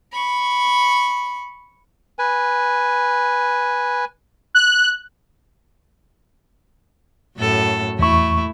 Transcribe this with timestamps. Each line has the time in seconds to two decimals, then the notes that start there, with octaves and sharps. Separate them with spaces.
0.12 B5 C#6
2.19 B4 G#5
4.55 F#6
7.37 F#2 A2 A4
7.99 E2 A3 E4 C#6